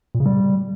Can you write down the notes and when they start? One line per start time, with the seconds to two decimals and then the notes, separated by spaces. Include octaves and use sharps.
0.15 A#2
0.20 C#3
0.26 G3